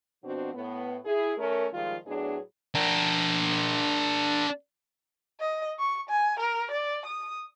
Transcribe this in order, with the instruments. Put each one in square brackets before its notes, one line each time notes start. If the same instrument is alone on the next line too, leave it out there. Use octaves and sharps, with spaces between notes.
[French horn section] B2 F3 C4 D4 F#4
A2 B3
E4 G#4
A3 C#4 A#4
D#3 F3 G3 G#3 F4
A2 F#3 B3 D4 G#4
[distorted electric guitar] D4 A#4
[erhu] D#5
C#6
G#5
A#4
D5
D#6